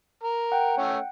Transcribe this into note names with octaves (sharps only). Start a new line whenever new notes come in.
A#4
F#5 G5
A3 C#4